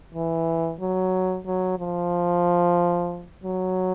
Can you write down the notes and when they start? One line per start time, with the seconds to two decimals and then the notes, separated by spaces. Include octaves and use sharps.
0.14 E3
0.80 F#3
1.46 F#3
1.79 F3
3.44 F#3